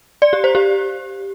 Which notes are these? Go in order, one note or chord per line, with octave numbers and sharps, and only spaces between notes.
D5
G4
C5
G4